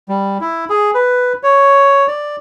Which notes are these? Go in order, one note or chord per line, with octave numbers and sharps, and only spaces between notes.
G3
E4
G#4
B4
C#5
D5